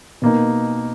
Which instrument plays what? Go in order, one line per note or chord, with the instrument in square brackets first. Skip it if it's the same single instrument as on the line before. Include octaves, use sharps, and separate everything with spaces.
[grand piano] B2 A#3 D#4